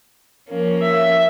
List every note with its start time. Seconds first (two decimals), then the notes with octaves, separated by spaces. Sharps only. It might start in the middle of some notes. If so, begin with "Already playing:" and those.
0.49 F3 A#3 C#4
0.82 E5